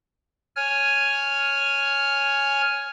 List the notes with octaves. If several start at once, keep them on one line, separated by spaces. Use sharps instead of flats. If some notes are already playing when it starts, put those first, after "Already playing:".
C#5 G#5 F6